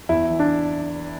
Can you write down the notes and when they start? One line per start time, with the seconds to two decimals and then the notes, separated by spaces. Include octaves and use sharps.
0.09 E2 E4
0.30 E3
0.39 D4